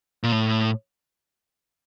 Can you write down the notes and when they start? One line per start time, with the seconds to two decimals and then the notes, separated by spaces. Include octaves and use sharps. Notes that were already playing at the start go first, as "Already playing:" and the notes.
0.23 A#2
0.32 A2